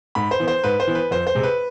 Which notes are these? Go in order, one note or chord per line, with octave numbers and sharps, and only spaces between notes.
G#2 B5
C5
E3 B3
C5
G#2 B4
C5
E3 B3
B4
F2 C5
C5
C3 G#3
B4